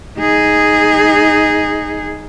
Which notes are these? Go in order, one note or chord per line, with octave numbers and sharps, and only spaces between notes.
D#4 G#4